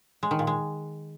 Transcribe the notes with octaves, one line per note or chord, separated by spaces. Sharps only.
G#3
D#3
A#2
G#3